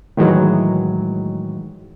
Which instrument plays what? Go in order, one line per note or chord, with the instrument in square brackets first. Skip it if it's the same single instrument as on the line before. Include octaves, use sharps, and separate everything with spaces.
[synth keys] A2 D#3 E3 F#3 G#3